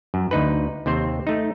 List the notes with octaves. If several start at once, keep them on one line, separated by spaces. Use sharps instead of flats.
F#2
D2 D#4 B4
D#2 C3 C4 C5
A3 D#4